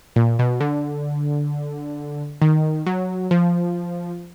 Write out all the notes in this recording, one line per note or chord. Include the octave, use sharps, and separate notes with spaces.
A#2
B2
D3
D#3
F#3
F3